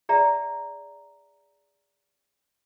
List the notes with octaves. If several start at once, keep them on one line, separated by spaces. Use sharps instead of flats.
G#4 D5 E5 A#5